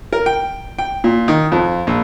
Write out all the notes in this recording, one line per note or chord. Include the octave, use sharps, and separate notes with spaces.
A#4
G5
G5
A#2
D#3
F2
A#1